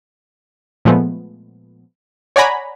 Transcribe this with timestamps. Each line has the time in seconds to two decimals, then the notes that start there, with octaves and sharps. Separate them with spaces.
0.85 A#2 F3 G#3 A3 B3
2.36 C#5 D5 F#5 G#5 A#5 B5